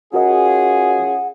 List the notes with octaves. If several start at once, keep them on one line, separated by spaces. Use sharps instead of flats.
C#4 F4 F#4 G#4 A#4 D#5 F#5